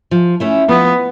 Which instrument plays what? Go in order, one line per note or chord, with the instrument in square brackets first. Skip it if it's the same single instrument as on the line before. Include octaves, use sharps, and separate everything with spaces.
[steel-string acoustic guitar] F3
A3 C#4 E4
[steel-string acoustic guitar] F3 [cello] B3